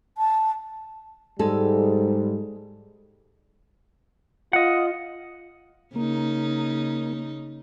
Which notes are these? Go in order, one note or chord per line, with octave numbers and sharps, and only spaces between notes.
A5
G#2 G3 G#3 A4
F4 D#5 F#5
C#3 A#3 D#4